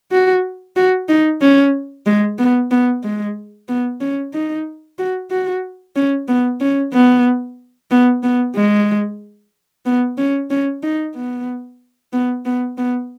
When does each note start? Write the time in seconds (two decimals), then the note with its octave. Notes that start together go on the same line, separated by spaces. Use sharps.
0.11 F#4
0.76 F#4
1.09 D#4
1.41 C#4
2.06 G#3
2.38 B3
2.71 B3
3.03 G#3
3.68 B3
4.01 C#4
4.34 D#4
4.99 F#4
5.31 F#4
5.96 C#4
6.28 B3
6.60 C#4
6.93 B3
7.91 B3
8.23 B3
8.56 G#3
9.85 B3
10.18 C#4
10.50 C#4
10.83 D#4
11.15 B3
12.13 B3
12.45 B3
12.78 B3